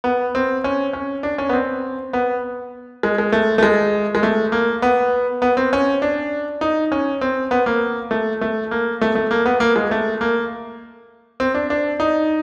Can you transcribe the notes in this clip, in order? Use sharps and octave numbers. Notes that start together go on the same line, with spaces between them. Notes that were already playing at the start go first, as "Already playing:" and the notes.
B3
C4
C#4
C#4
D4
C#4
B3
C4
B3
G#3
G#3
A3
A3
G#3
G#3
A3
A#3
B3
B3
C4
C#4
D4
D#4
C#4
C4
B3
A#3
A3
A3
A#3
A3
A3
A#3
B3
A#3
G#3
A3
A#3
C4
D4
D4
D#4